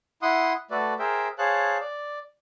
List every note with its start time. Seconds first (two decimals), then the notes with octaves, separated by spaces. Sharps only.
0.22 E4 F#5 C6 D#6
0.71 A3 F#4 A4 B4 D5
0.99 G#4 A#4 C5 E5 G5
1.38 G#4 C5 C#5 F5 A5 F#6
1.81 D5